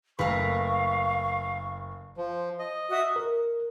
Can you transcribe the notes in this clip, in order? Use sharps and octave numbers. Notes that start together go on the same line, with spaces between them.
F#1 A3 A#4 B4 F5 C#6
F3
D#5
F#4 E5 D#6
A#4